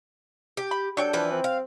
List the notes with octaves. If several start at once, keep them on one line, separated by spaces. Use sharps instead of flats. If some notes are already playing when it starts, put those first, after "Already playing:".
G4
B5
F#3 D4 A4 C#5 G5
E3 F3 B4
C4
F5